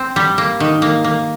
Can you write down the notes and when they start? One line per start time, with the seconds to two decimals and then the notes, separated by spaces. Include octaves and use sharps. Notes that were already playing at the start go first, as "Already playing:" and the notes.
Already playing: C4
0.16 G3
0.38 A#3
0.60 D#3
0.82 A#3
1.04 A#3